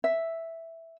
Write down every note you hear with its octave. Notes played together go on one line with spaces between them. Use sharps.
E5